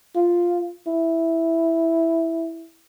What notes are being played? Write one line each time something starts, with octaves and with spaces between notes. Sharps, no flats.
F4
E4